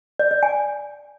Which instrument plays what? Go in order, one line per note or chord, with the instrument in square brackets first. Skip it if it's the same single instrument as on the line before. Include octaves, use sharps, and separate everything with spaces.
[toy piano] D5
D5
G#5